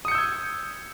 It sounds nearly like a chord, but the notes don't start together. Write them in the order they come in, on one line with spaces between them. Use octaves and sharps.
D#6 C#7 G6 E6 G#6